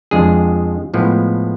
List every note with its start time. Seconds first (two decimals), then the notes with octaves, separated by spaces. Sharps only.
0.11 F2 F3 G#3 D4 G#4
0.94 A2 F3 G#3 B3